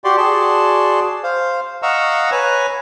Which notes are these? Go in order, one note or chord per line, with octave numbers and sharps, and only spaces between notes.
F#4 G4 D5 C6
F#4 G#4 D5 A5 C6
C5 F5
D#5 F5 F#5 A#5 C#6 E6
B4 C#5 G#5 A#5